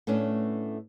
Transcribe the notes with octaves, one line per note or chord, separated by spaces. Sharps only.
A2 A3 B3 C#4 D4